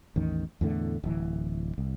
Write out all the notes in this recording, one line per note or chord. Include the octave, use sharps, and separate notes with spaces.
A1 E2 D#3
E2 A2 D3 A3
D1 E3
C2